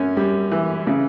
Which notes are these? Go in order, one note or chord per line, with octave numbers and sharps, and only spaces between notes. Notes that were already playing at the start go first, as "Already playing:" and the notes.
Already playing: F#2 C#4
G3
E3
C#3